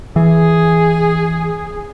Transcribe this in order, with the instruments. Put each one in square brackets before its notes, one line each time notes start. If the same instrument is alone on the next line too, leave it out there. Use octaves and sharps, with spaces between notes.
[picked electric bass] E3 [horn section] G#4